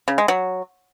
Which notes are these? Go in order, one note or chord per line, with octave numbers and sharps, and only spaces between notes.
C#3
G#3
F#3